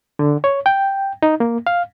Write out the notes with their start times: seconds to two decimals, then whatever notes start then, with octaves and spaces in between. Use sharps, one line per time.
0.19 D3
0.44 C#5
0.66 G5
1.23 D#4
1.40 A#3
1.67 F5